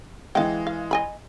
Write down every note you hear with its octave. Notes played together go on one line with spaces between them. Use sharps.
E3 G#3 F5 G5
F5
D#5 G#5 B5